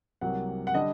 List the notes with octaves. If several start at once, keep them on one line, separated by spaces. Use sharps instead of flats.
C2 C3 F#3 A#3 F#5
F#5
D3 G3 D4 D#5